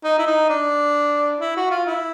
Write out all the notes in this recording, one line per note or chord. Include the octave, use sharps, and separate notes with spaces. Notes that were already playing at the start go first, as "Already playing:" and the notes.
D#4
E4
D#4
D4
E4
F#4
F4
E4